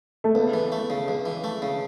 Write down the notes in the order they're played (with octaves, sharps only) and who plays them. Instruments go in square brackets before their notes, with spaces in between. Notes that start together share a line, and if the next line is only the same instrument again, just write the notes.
[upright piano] A3
[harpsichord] C#2 [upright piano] B3
[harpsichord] E3
A3
C#3
C#2
E3
A3
C#3